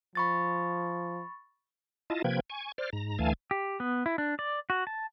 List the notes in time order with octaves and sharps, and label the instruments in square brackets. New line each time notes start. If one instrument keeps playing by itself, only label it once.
[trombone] F3 [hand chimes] B5 C#6 A6
[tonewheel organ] E4 F4 D#5 A5
C3 F3 A#3 B4 G5 G#6
G#5 C#6
C5 D5 F6
G#2 A#5
D2 E3 A3 F5 G#5 A5
[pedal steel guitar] G4
B3
E4
D4
D5
F#4
A5